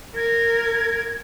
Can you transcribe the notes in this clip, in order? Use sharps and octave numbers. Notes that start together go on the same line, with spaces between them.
A#4 G#6